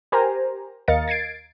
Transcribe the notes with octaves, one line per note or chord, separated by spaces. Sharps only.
G4 A#4 C5 G#5 A#5
D#2 A#4 D#5 F5 A6 C#7
G#6 A6 C7 D7